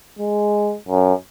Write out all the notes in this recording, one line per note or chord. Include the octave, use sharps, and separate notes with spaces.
G#3
F#2